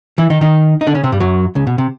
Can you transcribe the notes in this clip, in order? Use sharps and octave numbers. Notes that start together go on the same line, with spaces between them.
E3 E4
D#3 D#4
D#3 D#4
D#4
D3 D4
C#3 C#4
C3 C4
G2 G3
F#2 F#3
C#2 C#3
B2
C3